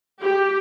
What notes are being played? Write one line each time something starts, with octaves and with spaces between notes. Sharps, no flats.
G4